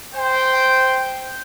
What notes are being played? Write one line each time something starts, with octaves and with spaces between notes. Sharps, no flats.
C5 G5